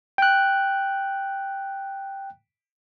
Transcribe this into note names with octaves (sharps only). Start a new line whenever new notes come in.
G5 F#6